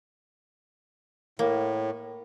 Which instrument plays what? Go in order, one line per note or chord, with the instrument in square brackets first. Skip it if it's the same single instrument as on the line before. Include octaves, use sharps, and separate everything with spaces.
[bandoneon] A2 [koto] A#3